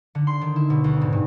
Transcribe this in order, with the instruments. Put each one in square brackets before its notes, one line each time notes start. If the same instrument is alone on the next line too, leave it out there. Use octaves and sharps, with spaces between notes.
[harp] D3
C6
D#3
E4
B2
D2
G#2
G2